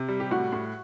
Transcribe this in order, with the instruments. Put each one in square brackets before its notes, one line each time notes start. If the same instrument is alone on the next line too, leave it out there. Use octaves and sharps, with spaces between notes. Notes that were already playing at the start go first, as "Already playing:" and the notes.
Already playing: [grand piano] C3
G3
[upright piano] G4
[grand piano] A2 [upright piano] F#4
[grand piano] A2